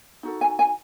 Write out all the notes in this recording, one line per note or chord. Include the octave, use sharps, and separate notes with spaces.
D#4 F#4 A4
G#5
G#5